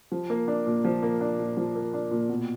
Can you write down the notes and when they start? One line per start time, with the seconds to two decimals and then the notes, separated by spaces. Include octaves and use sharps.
0.12 F3
0.30 A#3
0.48 D4
0.66 A#2
0.85 F3
1.03 A#3
1.21 D4
1.39 A#2
1.57 F3
1.75 A#3
1.94 D4
2.11 A#2
2.29 B2